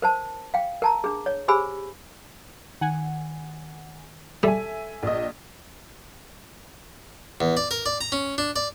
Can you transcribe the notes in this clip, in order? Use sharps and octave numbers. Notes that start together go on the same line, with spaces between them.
A#4 C5 A5
F5 G5
A#4 A5 A#5
D4 G#4
C#5
G4 G#4 C5 G#5 B5 E6
D#3 F#5 G#5
G3 A4 E5 G#5
A#1 D#5
E2
D5
A#4
D5
A#5
C#4
D4
D5